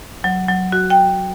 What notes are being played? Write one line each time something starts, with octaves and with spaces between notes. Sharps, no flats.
F#3
F#3
F#4
G5